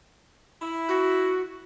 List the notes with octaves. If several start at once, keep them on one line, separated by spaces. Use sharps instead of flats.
E4
F#4